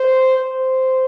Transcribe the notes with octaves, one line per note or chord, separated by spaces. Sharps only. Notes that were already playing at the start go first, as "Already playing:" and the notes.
Already playing: C5
C5